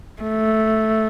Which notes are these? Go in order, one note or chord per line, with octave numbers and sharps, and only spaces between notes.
A3